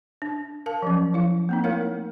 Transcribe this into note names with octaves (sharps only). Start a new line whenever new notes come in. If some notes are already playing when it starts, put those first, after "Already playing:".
D4
A#4 F5 A5
F3 F#3 C#4
F3 E4 F5
A#3 C4 D#4
A3 E4 A#4 C#5 F5